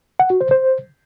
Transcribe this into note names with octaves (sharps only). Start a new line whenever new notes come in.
F#5
F#4
C5
C5